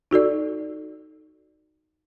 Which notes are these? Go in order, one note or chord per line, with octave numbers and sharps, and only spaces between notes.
D#4 F#4 A4 D5